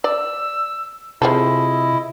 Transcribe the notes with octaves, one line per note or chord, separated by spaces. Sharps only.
D5 E6
C3 F3 E4 G#4 A4 D#5